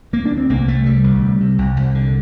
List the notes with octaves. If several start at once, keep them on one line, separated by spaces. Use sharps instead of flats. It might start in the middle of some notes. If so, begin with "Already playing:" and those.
D2 A#3
D4
D2
C4
C2 A#3
C2 A3
C3 G3
D2
C3
C3
C2
C2
D3